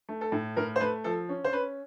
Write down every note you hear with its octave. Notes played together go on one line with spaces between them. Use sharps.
A3
A4
A2
A2 A#4
C5
A3 B4
F3 A4
C#4
C5
C#4 B4